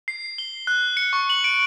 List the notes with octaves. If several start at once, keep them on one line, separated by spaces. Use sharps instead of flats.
C7
G7
F#6
C#7
C#6
F#7
D7